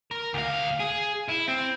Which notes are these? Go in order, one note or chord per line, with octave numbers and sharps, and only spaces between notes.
A#4
D2 F5
G#4
E4
C4